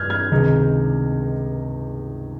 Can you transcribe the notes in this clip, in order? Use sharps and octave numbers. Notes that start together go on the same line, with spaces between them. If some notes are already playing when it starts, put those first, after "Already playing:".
Already playing: G2 F6 G6 G#6
F6 G#6
C#2 C3 D#3 G#3 D#4